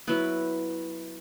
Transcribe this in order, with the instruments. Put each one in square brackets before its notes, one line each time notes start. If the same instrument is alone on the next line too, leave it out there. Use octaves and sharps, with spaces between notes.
[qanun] F#3 B3 E4